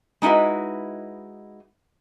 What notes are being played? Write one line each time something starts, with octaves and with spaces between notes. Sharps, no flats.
G#3 D#4 E4 F#4 B4